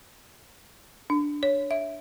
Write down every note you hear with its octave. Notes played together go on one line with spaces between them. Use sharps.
D4
C#5
E5